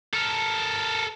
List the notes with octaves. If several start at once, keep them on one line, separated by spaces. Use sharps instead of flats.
A4 A#4